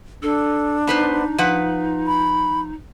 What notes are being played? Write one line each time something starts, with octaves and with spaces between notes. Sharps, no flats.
D4 A4
B3 D#4 B4 C5
F3 B4 F#5
B5